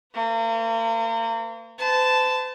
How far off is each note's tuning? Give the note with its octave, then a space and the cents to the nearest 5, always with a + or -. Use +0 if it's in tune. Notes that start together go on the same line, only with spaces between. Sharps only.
A#3 -40 B4 +40
C5 -45 A5 -5